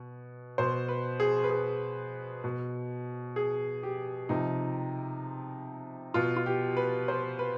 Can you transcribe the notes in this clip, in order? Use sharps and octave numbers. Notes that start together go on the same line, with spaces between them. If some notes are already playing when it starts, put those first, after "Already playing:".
Already playing: B2
B2 C5
B4
G#4
B4
G#4
B2
G#4
G4
C3 F3 D#4
B2 F4
F4
G4
B4
C5
B4